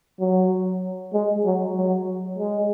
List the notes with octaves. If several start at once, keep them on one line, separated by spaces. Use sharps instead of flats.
F#3
G#3
F#3
F#3
G#3